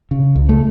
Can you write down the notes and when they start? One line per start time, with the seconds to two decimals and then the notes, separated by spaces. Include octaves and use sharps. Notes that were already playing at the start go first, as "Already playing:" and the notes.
0.11 C#3
0.36 C#2
0.49 A3